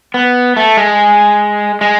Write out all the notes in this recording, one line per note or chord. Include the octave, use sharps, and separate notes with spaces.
B3
A3
G#3
G#3